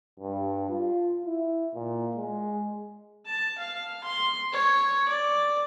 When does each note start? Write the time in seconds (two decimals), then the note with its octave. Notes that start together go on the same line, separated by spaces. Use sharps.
0.20 G2
0.69 F4
1.26 E4
1.74 A#2
2.16 G#3
3.26 A5
3.58 F5
4.04 C6
4.53 C#5
5.08 D5